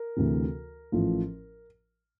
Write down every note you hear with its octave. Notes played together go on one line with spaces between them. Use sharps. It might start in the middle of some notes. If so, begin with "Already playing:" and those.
Already playing: A#4
D2 C3 E3
A1 A2 F3